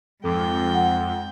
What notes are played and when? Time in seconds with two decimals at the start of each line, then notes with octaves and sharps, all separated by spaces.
0.24 F2 G#2 A4 G5 D6
0.74 F#5